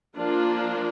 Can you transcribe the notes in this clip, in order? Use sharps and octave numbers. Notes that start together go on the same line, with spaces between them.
F3 A#3 D4 F4